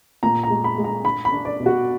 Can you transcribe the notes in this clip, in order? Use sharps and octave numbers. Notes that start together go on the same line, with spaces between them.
A#2 A#5
A#5
G#3
B5
G#3
A#5
D4 B5
B5
D4
D5
B2
F#4